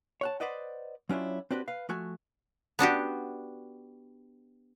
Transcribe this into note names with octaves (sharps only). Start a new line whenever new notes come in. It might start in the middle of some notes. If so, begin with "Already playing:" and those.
C#5 F#5 A5
B4 C5 D5 D#5 F#5
F#3 C#4 D4 E4 F4
C4 D4 F#4 G4 B4
B4 F5
F3 A3 F#4 G#5
B3 D4 F#4 G4